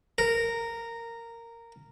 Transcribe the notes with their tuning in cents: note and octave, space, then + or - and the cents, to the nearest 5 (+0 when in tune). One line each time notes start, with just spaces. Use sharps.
A#4 -10